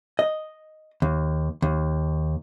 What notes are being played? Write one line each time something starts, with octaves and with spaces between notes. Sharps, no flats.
D#5
D#2
D#2